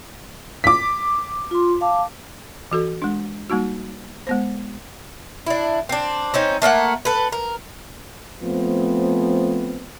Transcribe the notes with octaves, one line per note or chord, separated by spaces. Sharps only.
D6 B6
F4 C6
F5 A5 D6
E3 F#4 A4
G#3 D4
G3 A#3 D#4 F#4
G#3 B3 C5
D4 E4
C4 D4
C4 C#4 D#4
A3 A#3 E5 F#5
A4 B4
A#4
F3 A3 B3 C4